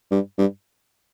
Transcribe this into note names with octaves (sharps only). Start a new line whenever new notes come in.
G2
G2